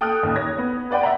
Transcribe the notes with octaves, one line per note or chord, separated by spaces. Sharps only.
A4 G5 D#6 F6 F#6
A1 D#2
C#5 G#6 A#6
B3
B4 D5 F#5 G5 B5
D5 E5 F#5 G5 A#5